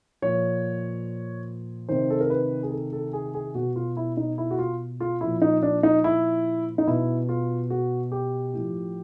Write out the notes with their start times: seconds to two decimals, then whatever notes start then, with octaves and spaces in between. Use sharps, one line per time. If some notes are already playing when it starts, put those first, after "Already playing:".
0.22 A#2 F3 C#5
1.89 C3 D#3 C5
2.10 A4
2.20 A#4
2.30 B4
2.63 G#4
2.72 A4
2.93 A4
3.13 G#4
3.34 G#4
3.55 B2 F#4
3.76 F4
3.97 E4
4.17 D#4
4.38 E4
4.51 F#4
4.59 F4
5.00 F4
5.21 A#2 F3 E4
5.42 D#4
5.63 D4
5.83 D#4
6.04 E4
6.78 D#4
6.87 B2 E4
7.29 F4
7.70 F#4
8.12 G4
8.53 A2 F3